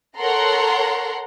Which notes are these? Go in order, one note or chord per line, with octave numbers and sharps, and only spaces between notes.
A4 A#4 C#5 F#5 A#5 C6